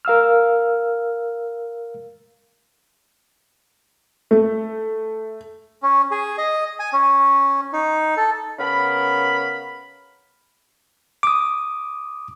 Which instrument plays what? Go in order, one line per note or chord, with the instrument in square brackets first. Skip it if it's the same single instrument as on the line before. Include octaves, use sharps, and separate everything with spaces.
[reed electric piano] A#4 F5 E6 F6
[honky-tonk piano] A3
[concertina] C#4
G#4
D#5
G#5
C#4
D#4
A4
[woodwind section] C#3 B3 A#4 B5
[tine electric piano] D6 D#6